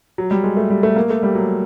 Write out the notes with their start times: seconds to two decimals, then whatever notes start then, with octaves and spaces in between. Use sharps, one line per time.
0.18 F#3
0.31 G3
0.44 G#3
0.57 A3
0.70 G3
0.83 A3
0.96 A#3
1.10 A3
1.23 G3
1.35 F#3